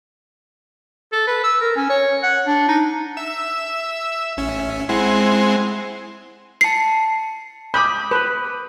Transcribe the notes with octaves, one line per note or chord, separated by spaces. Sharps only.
A4
B4
E6
A#4
C#4
C#5
F#5
D4
D#4
E5 E6
A1 C#4 E5
G#3 C4 E4 F#5
A5 C7 C#7
B5 D6 D#6 G6
B4